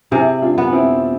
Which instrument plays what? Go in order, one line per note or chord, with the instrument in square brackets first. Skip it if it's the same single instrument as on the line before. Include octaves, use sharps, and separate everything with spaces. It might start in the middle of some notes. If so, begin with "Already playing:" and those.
[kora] C3 [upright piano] E4 G#4
[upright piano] D4 F4
[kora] B3
[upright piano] C4 E4